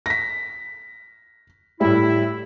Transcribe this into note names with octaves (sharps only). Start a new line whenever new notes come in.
A#6 B6
A2 G3 E4